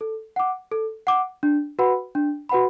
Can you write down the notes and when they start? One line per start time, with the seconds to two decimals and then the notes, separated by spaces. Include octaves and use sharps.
0.01 A4
0.36 F#5 D6
0.72 A4
1.07 F#5 D6
1.43 D4
1.79 F#4 B4 F#5 B5
2.15 D4
2.49 F#4 B4 F#5 B5